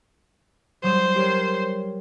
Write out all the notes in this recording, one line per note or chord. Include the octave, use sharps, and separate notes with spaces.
F#3 G3 C5 D#6
G4 A#4 C#5